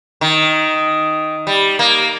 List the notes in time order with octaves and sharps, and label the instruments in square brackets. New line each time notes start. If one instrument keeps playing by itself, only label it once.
[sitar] D#3
G3
A#3